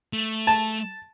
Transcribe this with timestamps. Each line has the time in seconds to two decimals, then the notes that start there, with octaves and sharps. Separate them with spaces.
0.13 A3
0.47 A5